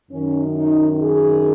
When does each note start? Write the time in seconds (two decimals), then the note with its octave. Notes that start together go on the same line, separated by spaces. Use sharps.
0.12 F#2 D#3 C#4
0.57 D#4
1.02 G#4